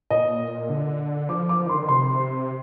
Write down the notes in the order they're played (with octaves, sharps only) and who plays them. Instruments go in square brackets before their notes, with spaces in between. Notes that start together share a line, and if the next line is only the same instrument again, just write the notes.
[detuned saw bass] A#2 [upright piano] D#5
[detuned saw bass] D3
[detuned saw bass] F3 [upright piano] D6
[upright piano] D6
[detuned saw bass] F3
D#3
[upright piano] C6
[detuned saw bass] D3
D#3
[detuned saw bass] C3 [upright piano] C6